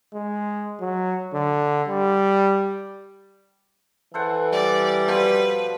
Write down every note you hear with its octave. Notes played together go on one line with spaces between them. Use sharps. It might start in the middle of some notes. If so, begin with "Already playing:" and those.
G#3
F#3
D3
G3
E3 A4 C5 F#5
G3 D5
B2 F3 B4 C5